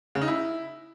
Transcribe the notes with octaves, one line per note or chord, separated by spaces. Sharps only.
C#3
D#4
E4